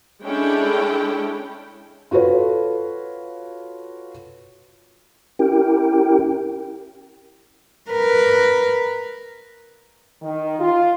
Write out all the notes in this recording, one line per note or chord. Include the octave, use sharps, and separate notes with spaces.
G#3 C#4 D4 E4 A4 G5
F4 F#4 A4 B4 C#5
C#4 E4 G4 A#4 G5
A#4 B4
D#3
F4